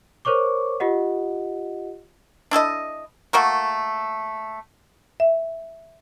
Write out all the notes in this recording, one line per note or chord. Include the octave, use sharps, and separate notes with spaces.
A#4 C5 C#5 C#6 D6
F4 G4 D#5 F#5
D4 E4 A4 D#5
A3 A#3 F#4 A#4
E5